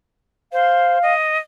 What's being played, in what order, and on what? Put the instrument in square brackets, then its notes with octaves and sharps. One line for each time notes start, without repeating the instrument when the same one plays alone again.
[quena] C5 [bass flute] F5
[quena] D#5